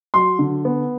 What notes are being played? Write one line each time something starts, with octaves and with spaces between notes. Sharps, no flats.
F#3 C6
D3
B3